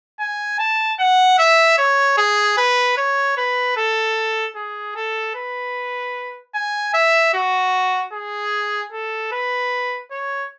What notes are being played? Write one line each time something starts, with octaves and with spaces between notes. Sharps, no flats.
G#5
A5
F#5
E5
C#5
G#4
B4
C#5
B4
A4
G#4
A4
B4
G#5
E5
F#4
G#4
A4
B4
C#5